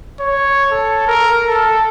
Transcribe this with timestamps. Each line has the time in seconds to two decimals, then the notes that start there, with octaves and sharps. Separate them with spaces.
0.20 C#5
0.71 A4
1.07 A#4
1.47 A4